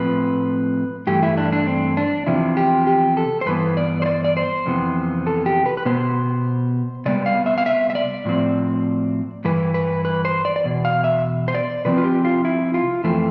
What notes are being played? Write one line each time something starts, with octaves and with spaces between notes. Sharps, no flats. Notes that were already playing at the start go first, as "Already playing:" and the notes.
Already playing: A2 F3 C4 B4
G2 E3 A3 G4
E4
D4
D4
C4
D4
E2 C3 F3 C4 E4
G4
G4
A4
C5
G2 E3 B3 B4
D5
C5
D5
D5
C5
F2 C3 E3 B3
A4
G4
B4
B4
B2 B3 C5
C3 G3 B3 D5
F5
E5
F5
E5
E5
D5
A2 F3 C4
G2 E3 B4
B4
B4
C5
D5
D5
E2 B2
F5
E5
C5
D5
C3 F3 C4 B4
F4
G4
F4
E4
F4
F2 E3 A3 C4